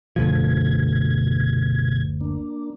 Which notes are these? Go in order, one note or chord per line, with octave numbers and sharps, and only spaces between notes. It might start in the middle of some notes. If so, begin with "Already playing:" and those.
F#1 D2 B2 F3 G#6
A#3 D4